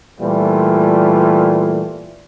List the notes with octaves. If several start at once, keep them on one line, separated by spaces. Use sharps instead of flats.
A#2 E3 G3 A3 F4